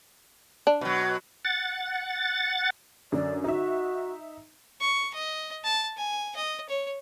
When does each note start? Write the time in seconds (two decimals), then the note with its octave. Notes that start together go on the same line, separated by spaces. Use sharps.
0.67 D4
0.81 B2 F#3
1.45 F#5 A6
3.12 F#2 D3 D5
3.44 D#4 F#4 E5
4.81 C#6
5.14 D#5
5.64 A5
5.97 G#5
6.36 D#5
6.69 C#5